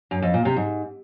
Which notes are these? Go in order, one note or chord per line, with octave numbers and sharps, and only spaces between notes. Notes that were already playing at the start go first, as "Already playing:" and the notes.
F#2
F2
A#2
C3
G#2